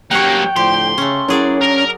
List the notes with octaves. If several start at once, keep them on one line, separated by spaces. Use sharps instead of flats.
G#1 F#3 A#3 C#4 G4 C#5 F#5 G5
A2 D3 F3 G4 C6
C#3 A3 C#4
F#3 C#4 E4 G#4 A#4 D5
D4 A#4